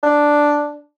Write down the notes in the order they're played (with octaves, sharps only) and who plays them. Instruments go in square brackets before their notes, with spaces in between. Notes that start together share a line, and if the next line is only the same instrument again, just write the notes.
[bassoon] D4